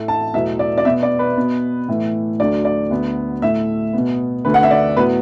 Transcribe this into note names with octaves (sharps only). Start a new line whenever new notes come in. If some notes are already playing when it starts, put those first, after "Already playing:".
Already playing: A2 A3
A5
E2 B2 F#3 A3 E5
D5
D5
B2 B3 E5
D5
B4
B2 B3
A2 E3 A3
D2 D3 F#3 D5
D5
D2 D3 B3
A2 A3 E5
B2 B3
D2 D3 A3 B4
F#5
E5
D5
A2 F#3 B3 B4